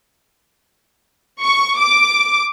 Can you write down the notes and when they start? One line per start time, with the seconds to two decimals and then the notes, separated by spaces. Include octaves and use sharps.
1.42 C#6
1.78 D6